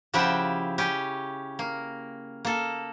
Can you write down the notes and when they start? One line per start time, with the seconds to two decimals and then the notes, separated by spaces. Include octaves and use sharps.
0.14 C#3 F3 E4 G4 E5 F#5
0.78 C#4 G4
1.59 A#3
2.45 A#3 A4